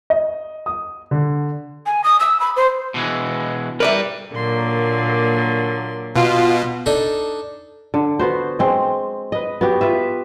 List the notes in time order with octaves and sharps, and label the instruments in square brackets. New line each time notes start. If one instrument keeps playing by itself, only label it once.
[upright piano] D#5
D#6
D3
[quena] G#5
D#6
E6
B5
C5
[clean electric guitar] B2 E3 G#3
[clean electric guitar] G3 B4 [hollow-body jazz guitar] A#4 D5 E5
[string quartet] A#2 D3 F#3 [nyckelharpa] A#3 C6
[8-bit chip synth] B2 [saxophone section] F4
[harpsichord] D4 D#4 A4
[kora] D3
B3 F#4 C5
G#3 C4
B4 D#5
B3 F#4 G4
F4 B4 E5